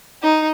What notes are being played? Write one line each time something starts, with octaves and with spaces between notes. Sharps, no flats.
D#4